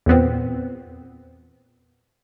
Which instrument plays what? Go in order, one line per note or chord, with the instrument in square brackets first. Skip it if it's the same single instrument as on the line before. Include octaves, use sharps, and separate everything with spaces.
[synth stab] E2 A#2 B3 C4